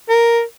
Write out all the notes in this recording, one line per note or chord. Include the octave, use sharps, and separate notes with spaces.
A#4